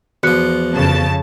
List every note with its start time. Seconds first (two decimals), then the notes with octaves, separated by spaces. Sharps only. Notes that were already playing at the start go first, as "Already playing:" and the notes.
0.23 E2 F3 F#4 F#6 C#7
0.74 F2 C#3 A5